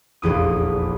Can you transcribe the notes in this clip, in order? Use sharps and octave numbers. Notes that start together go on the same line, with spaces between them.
F1 A#1 E2 D#6